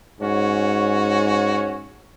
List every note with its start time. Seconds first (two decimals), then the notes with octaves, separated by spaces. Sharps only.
0.21 G#2 C#4 F#4 C#5